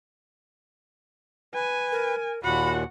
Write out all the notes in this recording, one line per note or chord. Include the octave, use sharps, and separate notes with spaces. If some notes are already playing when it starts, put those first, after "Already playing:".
B4 G#5
A#4
D#2 A#2 F#4 F#5 B5